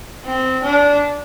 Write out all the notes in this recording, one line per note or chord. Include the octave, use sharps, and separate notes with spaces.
C4
D4